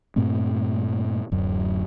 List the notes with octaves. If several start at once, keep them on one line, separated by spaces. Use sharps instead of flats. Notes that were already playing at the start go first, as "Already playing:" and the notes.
G2 A#2 A3 C4
D1 F#2